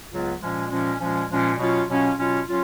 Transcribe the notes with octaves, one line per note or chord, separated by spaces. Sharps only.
C#2 C#3 F#3 B3 F4
A#2 F3 G#3 C#4
A#2 F3 G#3 C#4
A#2 F3 G#3 C#4
A#2 F3 G#3 C#4
B2 F#3 C#4 F4
B2 F#3 C#4 F4
B2 F#3 C#4 F4
F#3 C#4 F4